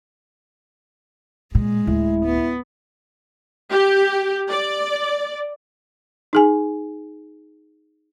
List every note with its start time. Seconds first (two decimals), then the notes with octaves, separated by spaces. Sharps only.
1.55 A#2 G#3
1.87 D1 E4
2.26 B3
3.70 G4
4.51 D5
6.33 D#4 G#4 G#5